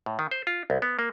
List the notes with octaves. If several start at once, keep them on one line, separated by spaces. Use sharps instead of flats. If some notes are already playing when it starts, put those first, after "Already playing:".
A2
D#3
C5
F4
C2
B3
A#3